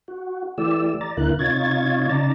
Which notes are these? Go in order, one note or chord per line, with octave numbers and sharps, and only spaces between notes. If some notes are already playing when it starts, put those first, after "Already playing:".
F#4
E3 A3 G4 D5 E6
D5 A#5 A6
D2 D3 A#3 E4 A#4 F#6
C3 D#4 F4 C#5 G#6 A6
C#3 D#4 D5 A5 A#5 A6